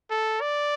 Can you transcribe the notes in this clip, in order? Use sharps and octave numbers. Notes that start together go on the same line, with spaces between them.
A4
D5